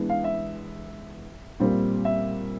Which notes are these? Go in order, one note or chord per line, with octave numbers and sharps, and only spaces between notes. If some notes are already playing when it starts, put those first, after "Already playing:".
Already playing: E3 G#3 B3 D4
F5
E5
A#2 G3 C4
E5